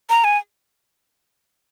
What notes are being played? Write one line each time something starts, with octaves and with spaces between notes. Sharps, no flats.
A#5
G#5